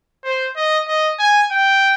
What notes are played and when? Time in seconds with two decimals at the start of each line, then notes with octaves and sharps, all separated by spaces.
0.24 C5
0.56 D#5
0.88 D#5
1.20 G#5
1.52 G5